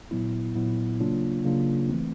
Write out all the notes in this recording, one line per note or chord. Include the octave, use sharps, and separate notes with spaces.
A#2 F#3 B3 E4
A#2 F#3 B3 E4
C#3 F#3 A#3 D4 F4
C#3 F#3 A#3 D4 F4
E3 A3 C4